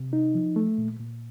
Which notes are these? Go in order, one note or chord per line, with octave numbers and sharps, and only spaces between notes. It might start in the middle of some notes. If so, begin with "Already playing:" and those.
Already playing: C3
D#4
F3
A3
A#2
A#2